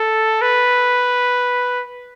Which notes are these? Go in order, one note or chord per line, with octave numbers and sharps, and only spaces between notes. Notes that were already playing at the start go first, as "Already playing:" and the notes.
Already playing: A4
B4